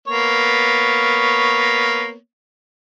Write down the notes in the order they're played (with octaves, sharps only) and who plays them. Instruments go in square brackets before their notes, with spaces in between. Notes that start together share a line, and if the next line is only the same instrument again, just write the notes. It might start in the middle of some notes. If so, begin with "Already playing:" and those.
[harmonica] A#3 B3 C#5